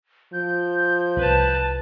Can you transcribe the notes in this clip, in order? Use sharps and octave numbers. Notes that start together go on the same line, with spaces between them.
F3 G6
C2 B4 A5